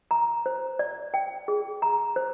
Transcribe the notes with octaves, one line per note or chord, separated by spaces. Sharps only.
A#5
C5
D5
G5
G#4
A#5
C5